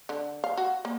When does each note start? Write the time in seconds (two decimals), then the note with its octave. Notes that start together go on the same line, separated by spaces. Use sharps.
0.09 D3
0.44 F5
0.57 F#4
0.85 A#3